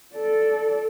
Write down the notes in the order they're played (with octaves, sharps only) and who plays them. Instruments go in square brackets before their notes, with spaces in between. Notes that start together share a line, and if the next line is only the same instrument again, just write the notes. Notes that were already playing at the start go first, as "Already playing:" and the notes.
[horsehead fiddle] A4 D5